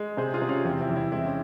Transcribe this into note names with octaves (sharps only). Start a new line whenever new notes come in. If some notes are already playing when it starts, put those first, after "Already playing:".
Already playing: G#3
C3 G#4 C5
F4 G#4
C3
C#4 F4
E2 C4
C4 E4
E2
C4 E4
G#3 C4 E4
C#4